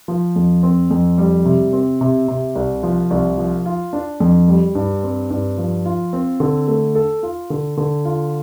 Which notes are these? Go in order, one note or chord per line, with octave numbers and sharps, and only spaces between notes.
F3
F2
C4
F2
G3
C3
C4
C3
C3
C2
F3
C2
F3
F4
D4
F2
G3
G2
C4
G2
F3
F4
C4
D3
A3
A4
F4
D3
D3
F4